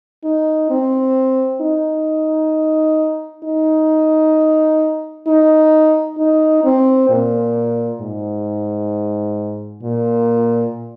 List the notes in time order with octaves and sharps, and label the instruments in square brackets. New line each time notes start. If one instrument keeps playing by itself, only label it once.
[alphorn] D#4
C4
D#4
D#4
D#4
D#4
C4
A#2
G#2
A#2